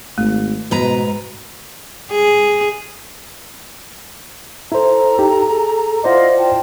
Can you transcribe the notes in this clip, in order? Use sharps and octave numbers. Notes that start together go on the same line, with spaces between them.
G#1 A3
G#2 B2 B4 A#5
G#4
E4 A4 C5 A#5
D#4 G4
G#4
E4 F4 C5 D5 D#5 F#5
F4 G5 A5